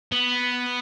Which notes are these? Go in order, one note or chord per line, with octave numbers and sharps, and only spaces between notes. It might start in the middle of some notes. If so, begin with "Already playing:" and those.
B3